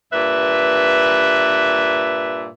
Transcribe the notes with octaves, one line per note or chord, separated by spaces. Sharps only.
G2 A#2 B4 E5